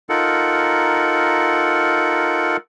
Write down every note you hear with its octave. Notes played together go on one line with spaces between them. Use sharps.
D#4 F4 A4 A#4 F#5